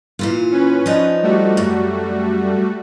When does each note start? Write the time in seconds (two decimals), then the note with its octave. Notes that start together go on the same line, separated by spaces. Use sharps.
0.19 A#2 E3 F4
0.52 C#4 B4
0.86 F3 D4 D#4
1.23 G3 A3 F#4
1.57 F#2